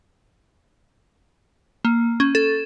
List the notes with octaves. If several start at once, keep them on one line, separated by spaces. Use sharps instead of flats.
A#3
C#4
A4